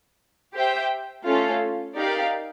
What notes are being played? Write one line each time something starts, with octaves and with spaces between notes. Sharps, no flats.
G4 C5 E5 G5
A3 C#4 F4 A4
D#4 G4 A#4 D5 F5